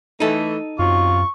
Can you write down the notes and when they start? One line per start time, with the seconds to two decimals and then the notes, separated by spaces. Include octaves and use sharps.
0.20 E3 A3 D#4 A4
0.79 F#2 C3 F#3 F4 C#6